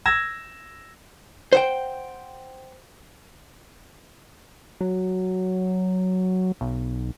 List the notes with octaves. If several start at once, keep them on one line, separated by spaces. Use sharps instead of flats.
E6 G#6 A#6 E7
C5 F#5 G5
F#3
B1